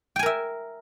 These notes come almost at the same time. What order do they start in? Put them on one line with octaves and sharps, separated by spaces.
G5 G#5 A#4 E5